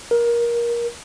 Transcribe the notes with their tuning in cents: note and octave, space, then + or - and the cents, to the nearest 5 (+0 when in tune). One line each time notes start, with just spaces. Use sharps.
A#4 +20